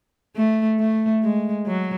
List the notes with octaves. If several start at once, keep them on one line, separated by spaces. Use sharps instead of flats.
A3
A3
G#3
F#3